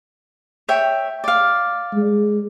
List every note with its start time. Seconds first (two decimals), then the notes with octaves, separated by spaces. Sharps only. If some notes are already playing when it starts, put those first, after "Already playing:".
0.68 C#5 E5 G5
1.24 D5 F5
1.94 G#3